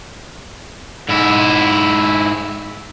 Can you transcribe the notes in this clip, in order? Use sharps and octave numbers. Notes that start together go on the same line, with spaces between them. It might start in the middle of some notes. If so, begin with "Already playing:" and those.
G#2 E4